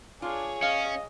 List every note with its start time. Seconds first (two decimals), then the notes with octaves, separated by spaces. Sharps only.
0.22 D4 F4 G#4 C#5
0.62 C#4 D#5 F5